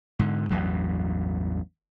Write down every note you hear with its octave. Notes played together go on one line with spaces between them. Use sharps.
G#2 D3
A1 E2 G2 F#3